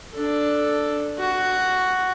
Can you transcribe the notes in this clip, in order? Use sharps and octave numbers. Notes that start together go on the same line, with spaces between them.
D4 A4
F#4